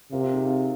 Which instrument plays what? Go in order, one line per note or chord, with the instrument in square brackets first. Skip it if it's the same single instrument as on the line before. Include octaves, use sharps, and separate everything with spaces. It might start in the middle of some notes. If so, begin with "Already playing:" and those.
[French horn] C3 [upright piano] F4 A#4
[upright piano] C4 F4
D#4 G#4
C4 F4